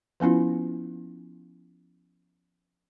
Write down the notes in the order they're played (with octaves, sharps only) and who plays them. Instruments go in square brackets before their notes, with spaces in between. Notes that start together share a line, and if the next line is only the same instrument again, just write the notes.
[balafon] F3 B3 C#4 E4 F4